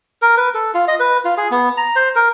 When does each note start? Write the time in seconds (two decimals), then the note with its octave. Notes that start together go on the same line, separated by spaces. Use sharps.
0.22 A#4
0.37 B4
0.55 A4
0.74 F4
0.88 D#5
1.00 B4
1.25 F4
1.38 G#4
1.51 B3
1.77 A#5
1.96 C5
2.16 A#4